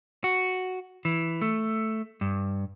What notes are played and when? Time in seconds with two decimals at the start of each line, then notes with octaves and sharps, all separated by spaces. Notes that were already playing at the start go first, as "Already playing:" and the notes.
0.24 F#4
1.05 E3
1.41 A3
2.21 G2